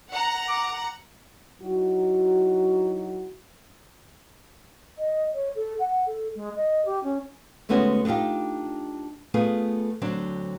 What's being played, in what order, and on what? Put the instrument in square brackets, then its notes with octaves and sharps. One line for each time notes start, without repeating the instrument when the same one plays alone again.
[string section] F#5 A#5
[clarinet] D6
[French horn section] F#3 D#4 E4 F#4
[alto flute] D#5
C#5
A4
F#5
A4
G#3
D#5
G4
C#4
[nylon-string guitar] D2 G#3 A3 B3 C#4 F#4
B3 D4 D#4 F4 G4
A3 B3 F4 G#4
D2 F#3 C4 D4